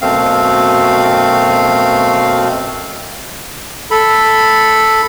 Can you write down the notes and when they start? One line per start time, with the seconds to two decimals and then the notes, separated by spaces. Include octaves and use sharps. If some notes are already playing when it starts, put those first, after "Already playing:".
0.01 F#2 B2 A3 C4 F5
3.91 A4 B5